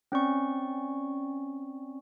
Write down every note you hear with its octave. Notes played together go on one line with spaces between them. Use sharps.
C4 C#4 D5 C#6